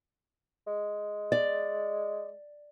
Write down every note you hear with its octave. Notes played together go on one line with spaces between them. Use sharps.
G#3
D5